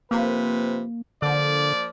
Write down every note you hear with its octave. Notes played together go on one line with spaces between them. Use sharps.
C3 F3 A#3 B4
D3 F3 A#3 D5